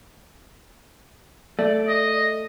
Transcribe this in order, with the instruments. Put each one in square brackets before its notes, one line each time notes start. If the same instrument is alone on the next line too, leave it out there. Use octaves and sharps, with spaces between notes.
[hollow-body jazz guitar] A3 [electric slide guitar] D5
[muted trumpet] D#5